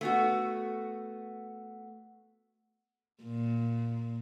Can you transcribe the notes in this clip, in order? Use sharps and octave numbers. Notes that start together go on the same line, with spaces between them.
A3 B3 F#4
A#2